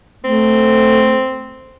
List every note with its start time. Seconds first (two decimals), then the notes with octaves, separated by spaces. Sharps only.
0.24 A3 C4